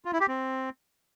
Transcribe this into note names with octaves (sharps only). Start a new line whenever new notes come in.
F4
E4
G4
C4